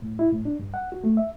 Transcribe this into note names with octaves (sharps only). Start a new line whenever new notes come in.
A2
E4
A2
D4
G2
F#5
F#4
A3
E5